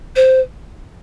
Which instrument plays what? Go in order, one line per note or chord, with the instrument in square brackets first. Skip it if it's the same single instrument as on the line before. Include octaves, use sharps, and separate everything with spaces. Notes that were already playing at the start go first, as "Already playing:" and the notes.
[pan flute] C5